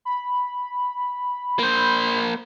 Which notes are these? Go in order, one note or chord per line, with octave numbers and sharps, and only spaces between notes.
B5
A#3 C5